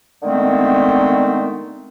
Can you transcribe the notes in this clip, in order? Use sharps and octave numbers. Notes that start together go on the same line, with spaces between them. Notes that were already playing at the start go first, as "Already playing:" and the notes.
D3 D#3 G#3 A3 B3 C4